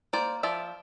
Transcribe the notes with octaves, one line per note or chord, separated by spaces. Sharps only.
A#3 C5 D5
F3 D5 E5